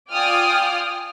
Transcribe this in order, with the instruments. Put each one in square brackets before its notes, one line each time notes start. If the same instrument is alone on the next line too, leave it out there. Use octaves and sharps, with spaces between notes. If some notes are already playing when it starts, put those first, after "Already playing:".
[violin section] F4 D5 G5 G#5 D#6 F6